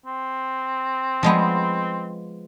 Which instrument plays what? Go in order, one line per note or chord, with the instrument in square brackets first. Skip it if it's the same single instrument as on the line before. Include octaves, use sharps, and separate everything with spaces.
[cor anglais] C4
[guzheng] F3 G#3 B3